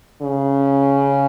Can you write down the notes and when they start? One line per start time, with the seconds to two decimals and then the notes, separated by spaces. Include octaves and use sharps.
0.22 C#3